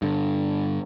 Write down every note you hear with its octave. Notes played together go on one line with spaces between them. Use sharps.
G2 D3